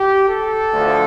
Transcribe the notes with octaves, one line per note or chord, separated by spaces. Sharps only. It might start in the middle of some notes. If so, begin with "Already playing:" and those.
Already playing: G4
A4
D2 D3 F3